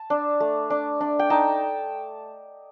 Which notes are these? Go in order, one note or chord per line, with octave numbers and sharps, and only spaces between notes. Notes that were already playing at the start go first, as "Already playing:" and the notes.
Already playing: A5
D4
A3
D4
D4
G5
D#4 A5